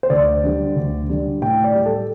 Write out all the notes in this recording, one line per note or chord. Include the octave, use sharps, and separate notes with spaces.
C5
D2 D5
D3 G3
D2
D3 G3
A2 G5
D5
G3
A4